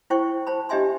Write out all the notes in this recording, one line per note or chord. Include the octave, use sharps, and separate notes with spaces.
E4 C5 G5 C#6
C5 A5 B5
D4 G4 D#5 E5 G#5 C6